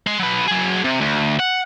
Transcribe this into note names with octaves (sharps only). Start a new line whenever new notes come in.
G#3 C6
F#3 B4
F#3 G#4
C3
D2
F#5